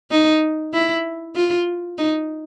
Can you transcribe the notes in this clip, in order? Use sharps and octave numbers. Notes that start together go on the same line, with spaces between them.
D#4
E4
F4
D#4